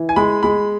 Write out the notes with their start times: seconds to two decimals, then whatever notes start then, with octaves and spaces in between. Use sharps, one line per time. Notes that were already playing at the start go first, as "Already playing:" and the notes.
Already playing: E3
0.09 G#5
0.16 G#3 B5
0.43 G#3 B5